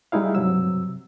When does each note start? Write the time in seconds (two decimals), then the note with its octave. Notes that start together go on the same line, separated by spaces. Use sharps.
0.12 G3 G#3 D#4 E4 F5
0.35 G2 C3 F#3 E6